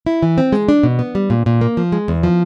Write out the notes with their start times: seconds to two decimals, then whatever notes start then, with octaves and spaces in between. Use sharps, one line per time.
0.06 E4
0.22 E3
0.38 C4
0.52 G#3
0.69 D4
0.83 B2
0.99 B3
1.15 G3
1.30 A#2
1.46 A#2
1.61 A#3
1.77 F3
1.92 G#3
2.08 E2
2.23 F3